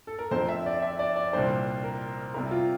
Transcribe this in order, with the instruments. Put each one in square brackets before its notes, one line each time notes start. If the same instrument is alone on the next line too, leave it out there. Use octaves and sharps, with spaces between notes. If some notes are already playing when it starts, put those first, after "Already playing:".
[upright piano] A4
A#4
[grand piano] F2 D3 F3 C4 [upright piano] C5
[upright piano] E5
D5
E5
D5
D5
[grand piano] C2 A#2 G3 D4 [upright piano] C5
[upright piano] A#4
[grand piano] C3 G3 C4 E4 A#4
[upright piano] F4